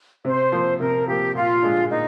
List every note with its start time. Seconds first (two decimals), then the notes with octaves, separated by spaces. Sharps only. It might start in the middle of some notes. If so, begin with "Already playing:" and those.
0.25 C3 C5
0.52 F3 A#3
0.80 C3 A#4
1.07 F3 A#3 G4
1.35 A#2 F4
1.62 G#3 D4
1.90 A#2 D#4